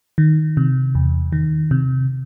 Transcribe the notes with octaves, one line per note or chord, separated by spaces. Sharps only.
D#3
C3
E2
D#3
C3